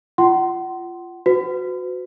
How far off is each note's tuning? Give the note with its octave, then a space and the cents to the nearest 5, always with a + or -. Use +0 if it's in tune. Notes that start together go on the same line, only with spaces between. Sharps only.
F4 -20 F#5 +35 C6 +0
F#4 -15 B4 +40